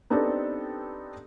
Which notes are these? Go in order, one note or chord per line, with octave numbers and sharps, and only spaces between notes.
B3 C4 D4 D#4 G4 A4